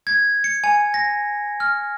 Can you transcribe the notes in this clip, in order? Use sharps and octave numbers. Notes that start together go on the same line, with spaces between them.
G#6
C#7
G#5
A#6
F6